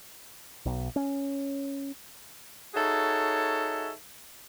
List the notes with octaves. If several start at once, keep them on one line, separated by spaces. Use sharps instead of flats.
B1
C#4
D#4 F#4 G#4 A4 C#5 E5